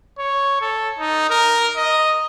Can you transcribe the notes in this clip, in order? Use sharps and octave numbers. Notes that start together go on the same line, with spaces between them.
C#5
A4
D#4
A#4
D#5